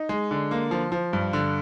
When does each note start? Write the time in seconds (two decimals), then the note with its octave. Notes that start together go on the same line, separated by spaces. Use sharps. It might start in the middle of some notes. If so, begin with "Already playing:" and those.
Already playing: D#4
0.09 G#3
0.31 D3
0.51 A#3
0.71 F3
0.92 F3
1.13 G2
1.33 D3